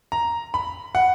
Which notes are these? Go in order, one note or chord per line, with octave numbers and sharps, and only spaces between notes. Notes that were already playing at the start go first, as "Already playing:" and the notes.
A#5
B5
F#5